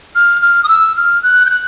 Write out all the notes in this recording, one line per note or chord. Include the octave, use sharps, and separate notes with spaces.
F6
F6
D#6
E6
F6
F#6
G6
F#6